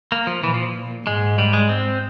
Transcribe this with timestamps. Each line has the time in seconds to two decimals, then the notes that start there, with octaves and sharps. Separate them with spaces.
0.12 A#3
0.27 F3
0.43 A#2 E3
0.54 F3
1.06 G#2 G#3
1.38 G3
1.53 G#3
1.69 C4